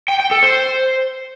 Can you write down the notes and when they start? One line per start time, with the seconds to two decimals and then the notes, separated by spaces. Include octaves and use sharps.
0.08 G5
0.20 G5
0.31 A4
0.43 C5